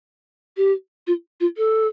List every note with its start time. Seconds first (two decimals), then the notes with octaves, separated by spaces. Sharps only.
0.57 G4
1.07 F4
1.40 F4
1.57 A4